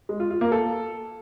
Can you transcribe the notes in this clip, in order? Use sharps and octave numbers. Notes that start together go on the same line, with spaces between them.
G#3
F4
F4
A#3
A4